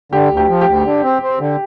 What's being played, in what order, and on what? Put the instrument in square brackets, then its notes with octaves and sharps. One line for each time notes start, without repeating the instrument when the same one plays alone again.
[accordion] D3 [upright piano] G4
[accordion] D2
[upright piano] G4
[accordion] F3
[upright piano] G4
[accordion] D2
D3
C4
C4
D3